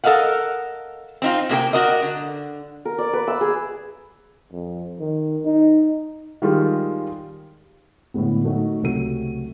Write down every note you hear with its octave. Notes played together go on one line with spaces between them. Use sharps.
A4 A#4 D#5 F5 F#5
C4 D#4 F4
C3 A#3 G#4 G5
F#4 A#4 D5 D#5
D3
A#4
D5
B4
E6
G#4
F2
D#3
D#4
D#3 G3 G#3 F4
A2 D3 G#3 B3
F#3 A3 D#4 F#4
C#2 C3 F#3 A3 D#7